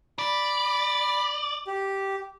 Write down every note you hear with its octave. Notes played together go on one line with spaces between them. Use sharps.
D5 B5
G4